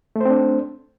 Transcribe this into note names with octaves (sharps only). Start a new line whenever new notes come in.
A3 C4 D4 C5